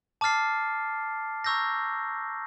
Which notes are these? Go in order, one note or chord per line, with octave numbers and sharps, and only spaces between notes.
A5 D6 F6 A6 C7
A#5 C#6 E6 G6 A#6